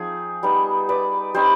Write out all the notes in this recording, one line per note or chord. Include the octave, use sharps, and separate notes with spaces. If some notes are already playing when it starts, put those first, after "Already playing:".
Already playing: F3 C4 D#4 G#4
G3 B3 D#4
B4 D5
G3 C4 D#4 C5 D#5